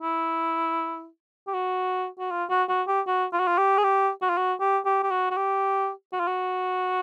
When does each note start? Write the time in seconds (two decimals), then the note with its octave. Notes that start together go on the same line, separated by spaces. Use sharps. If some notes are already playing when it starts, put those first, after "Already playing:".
0.01 E4
1.47 G4
1.54 F#4
2.19 F#4
2.31 F4
2.50 F#4
2.69 F#4
2.87 G4
3.07 F#4
3.32 F4
3.39 F#4
3.47 F4
3.58 G4
3.78 G#4
3.83 G4
4.21 F#4
4.29 F4
4.37 F#4
4.60 G4
4.85 G4
5.03 G4
5.11 F#4
5.30 F#4
5.37 G4
6.13 F#4
6.20 F4
6.27 F#4